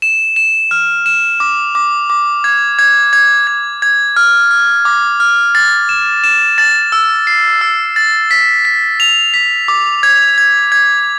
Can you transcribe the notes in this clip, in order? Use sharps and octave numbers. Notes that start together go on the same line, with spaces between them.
E7
E7
F6
E7
D6
D6
D6
G#6
G#6
G#6
G#6
G#6
F6
F6
D6
F6
A6
E7
E7
A6
E6
C7
E6
A6
B6
B6
F7
B6
D6
G#6
G#6
G#6